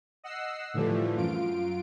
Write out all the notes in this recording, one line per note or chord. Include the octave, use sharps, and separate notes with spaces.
D#5 F#5 E6 C7
A2 D3 E3 F3 G3 A3
F#2 F4 D7